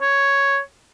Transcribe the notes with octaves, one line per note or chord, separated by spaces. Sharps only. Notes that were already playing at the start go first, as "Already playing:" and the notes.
C#5